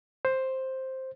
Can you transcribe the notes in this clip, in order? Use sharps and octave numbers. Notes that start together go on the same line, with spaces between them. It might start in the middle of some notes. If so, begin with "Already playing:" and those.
C5